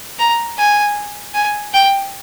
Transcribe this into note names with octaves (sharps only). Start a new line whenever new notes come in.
A#5
G#5
G#5
G5